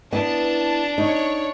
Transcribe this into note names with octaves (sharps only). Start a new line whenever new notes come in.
B3 D4 E4 A5
D#4 C#5